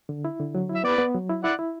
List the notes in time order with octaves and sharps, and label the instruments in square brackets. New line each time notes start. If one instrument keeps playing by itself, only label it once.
[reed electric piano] D3
E4
D3
F#3
E4
[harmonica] E5
[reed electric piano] B3 [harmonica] B4 D5
[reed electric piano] B3
F#3
E4
[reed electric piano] E4 [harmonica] D5 F#5
[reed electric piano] E4